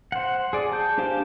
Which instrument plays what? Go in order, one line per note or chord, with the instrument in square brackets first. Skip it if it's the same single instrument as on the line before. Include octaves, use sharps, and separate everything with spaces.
[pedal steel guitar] C5 F#5
G#4 D5
A5 G6
D4 G4 C5 F5 G#5